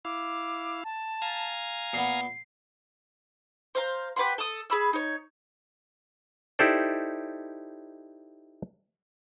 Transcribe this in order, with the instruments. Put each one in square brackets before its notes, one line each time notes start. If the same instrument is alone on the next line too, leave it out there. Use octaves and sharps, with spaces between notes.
[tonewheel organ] E4 F5 [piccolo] D6
[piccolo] A5
[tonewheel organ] F5 G#5 A#5
[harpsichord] A#2 B3 [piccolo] C7
[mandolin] C5 F5 A#5
G4 B4 F#5 C6
A4 D#6
G#4 B5 E6
D#4 C#5
[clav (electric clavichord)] D#4 E4 G4 A4 C5 D5